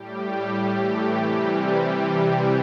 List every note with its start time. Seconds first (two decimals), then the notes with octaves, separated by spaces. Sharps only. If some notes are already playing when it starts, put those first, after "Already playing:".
Already playing: A2 G3 G4
0.31 A2 G3
0.74 A2 E3 A3 G4
1.16 C3 E3 G3